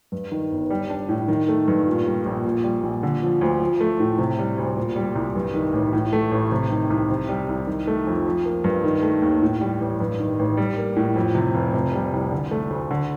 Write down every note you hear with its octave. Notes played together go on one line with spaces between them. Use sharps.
G2
D#3
G1
G3
D4
A2
D#3
A3
G2
A#2
G3
A#1
A#2
G3
A#1
D3
F3
D2
F3
A3
A2
C3
G3
D2
A#2
G3
C2
G2
D#3
A1
A2
A3
A1
C3
D#3
C2
C3
G3
C2
D#3
A3
F2
F3
A#3
G2
D#3
A3
D#2
A2
G3
A1
G2
D#3
A1
G3
A#3
A2
F2
C3
F1
C3
G3
C2
D3
A3
D2
D3